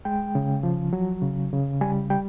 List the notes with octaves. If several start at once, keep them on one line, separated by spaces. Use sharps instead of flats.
G#3 G5
C#3
F3
F#3
C#3
C#3
G3 G#5
G3 G5